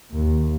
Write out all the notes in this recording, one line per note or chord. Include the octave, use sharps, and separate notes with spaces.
D#2